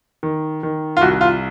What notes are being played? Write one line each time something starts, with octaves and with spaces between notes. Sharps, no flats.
D#3
D#3
F4
C2 F#4
F4